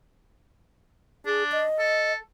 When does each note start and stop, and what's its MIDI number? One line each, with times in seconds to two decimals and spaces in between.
1.26 1.62 62
1.26 1.44 68
1.52 2.13 75
1.79 2.16 69